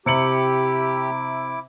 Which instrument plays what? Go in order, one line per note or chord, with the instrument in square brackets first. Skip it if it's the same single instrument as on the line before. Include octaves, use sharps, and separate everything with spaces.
[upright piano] C3 C#7 F#7 [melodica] E4 D6 [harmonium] G4